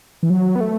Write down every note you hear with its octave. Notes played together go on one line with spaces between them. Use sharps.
E3
F#3
B3
A3